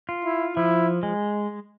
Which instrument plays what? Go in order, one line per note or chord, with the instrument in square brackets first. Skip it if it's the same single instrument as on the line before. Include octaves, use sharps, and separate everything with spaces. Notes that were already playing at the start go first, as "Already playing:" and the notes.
[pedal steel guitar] F4
[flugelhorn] E4
[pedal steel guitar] F3 [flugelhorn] E4
[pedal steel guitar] G#3